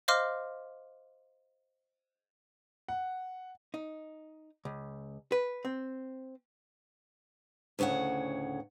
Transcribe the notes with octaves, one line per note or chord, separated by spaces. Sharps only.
C5 D#5 F5 C6 D6 F6
F#5
D#4
C#2
B4
C4
D2 A2 C#3 C#5 F#5